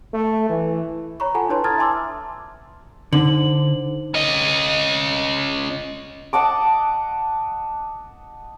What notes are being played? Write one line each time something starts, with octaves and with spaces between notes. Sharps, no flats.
A3
E3
C#5 A#5 B5 C#6
F4 A4 F#5 G#5 A5 B5
D4 E4 B4 C#5 A5 C6
A5 A#5 D#6 F6 G#6 A6
E5 G#5 A5 C6 D6 E6
D3 D#4 C5 F#7
C#4 D#5
D#5 F#5 A5 D6